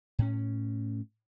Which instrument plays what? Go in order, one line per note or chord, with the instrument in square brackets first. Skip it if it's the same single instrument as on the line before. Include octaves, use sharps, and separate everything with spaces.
[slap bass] A2 C#4